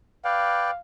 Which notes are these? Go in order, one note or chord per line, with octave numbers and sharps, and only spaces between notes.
B4 D5 F5 G5